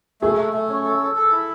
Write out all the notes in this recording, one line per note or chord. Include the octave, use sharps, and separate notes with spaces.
A3 G#4
A3
A3
C#4
A4
A4
A4
E4